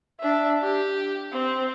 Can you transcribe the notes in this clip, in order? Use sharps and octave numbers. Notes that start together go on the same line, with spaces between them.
D4 E5
G4
C4